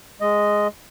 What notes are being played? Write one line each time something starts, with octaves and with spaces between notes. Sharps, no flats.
G#3 D#5